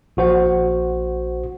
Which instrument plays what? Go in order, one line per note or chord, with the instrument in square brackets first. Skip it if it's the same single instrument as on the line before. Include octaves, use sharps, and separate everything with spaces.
[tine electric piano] A#1 F#4 C5 F#5